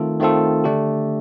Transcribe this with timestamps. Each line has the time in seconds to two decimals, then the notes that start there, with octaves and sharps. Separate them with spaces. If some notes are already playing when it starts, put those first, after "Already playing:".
Already playing: D#3 A3 C4 F4 A4
0.20 D#3 A3 C4 F4 A4
0.64 D3 A3 D4 G4